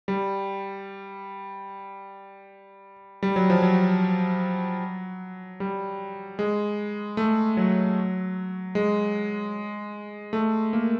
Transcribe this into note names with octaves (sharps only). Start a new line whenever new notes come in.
G3
G3
F#3
F3
F#3
G3
G#3
A3
F#3
G#3
A3
A#3